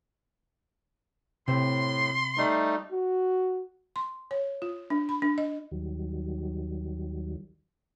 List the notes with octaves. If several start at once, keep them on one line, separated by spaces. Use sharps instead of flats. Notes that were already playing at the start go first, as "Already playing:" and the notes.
A2 C3 C5 C6
G3 A3 D#4
F#4
C6
C#5
F4
D4
B5
D4
D#5
D#2 D#3 F#3 G3